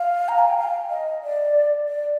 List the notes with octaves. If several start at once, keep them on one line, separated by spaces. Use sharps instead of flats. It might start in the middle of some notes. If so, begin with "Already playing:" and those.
Already playing: F5
A#5
G#5
G5
F5
D#5
D5
D5